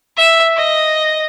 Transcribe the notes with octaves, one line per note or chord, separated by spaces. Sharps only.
E5
D#5